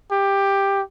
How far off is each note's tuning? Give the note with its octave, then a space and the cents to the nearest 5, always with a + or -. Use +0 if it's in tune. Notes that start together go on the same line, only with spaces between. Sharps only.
G4 +10